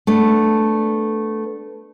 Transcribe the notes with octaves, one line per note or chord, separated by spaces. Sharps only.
A3 B3 D4